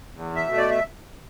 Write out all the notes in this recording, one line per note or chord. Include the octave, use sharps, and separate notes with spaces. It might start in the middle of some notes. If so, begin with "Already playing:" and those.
E2
E5
B2 A3
D5
E5